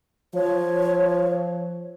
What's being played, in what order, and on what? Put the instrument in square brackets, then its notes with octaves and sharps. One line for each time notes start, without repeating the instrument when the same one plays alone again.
[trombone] F3 [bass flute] C#5